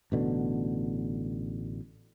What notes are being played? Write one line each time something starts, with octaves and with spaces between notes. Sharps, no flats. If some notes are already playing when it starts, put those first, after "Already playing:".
A1 B2 D3